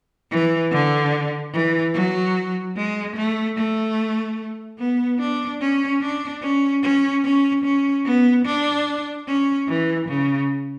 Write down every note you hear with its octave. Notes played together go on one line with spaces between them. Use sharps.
E3
D3
E3
F#3
G#3
A3
A3
B3
D4
C#4
D4
C#4
C#4
C#4
C#4
B3
D4
C#4
E3
C#3